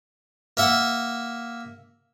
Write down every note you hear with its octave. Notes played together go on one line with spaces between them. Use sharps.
A#3 E5 F#5